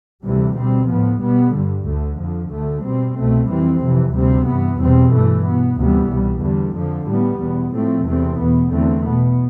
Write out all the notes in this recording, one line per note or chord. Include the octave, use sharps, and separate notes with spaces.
D2 C3 E3 G3
B2 G3 C4
A2 F3 B3
B2 G3 B3
G2 D3 G3
D2 D3 A3
F2 D3 F3
D2 D3 A3
B2 G3 C4
C2 B2 A3 C4
F2 E3 G3 C4
F2 C3 E3
D2 C3 G3 C4
G2 E3 B3
E2 B2 G3 C4
G2 E3 A3
B2 B3
D2 C3 E3 G3 B3
C2 B2 G3
E2 D3 G3
F2 D3 F3
A2 G3 B3
E2 B2 B3
A2 F3 A3 C4
E2 C3 E3 A3 C4
E2 B2 B3
E2 D3 A3 C4
B2 B3